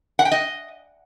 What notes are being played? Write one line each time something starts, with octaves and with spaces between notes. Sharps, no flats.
F#5
G5
D#5